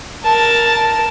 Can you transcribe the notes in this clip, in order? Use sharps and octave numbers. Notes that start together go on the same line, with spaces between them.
A#4 A5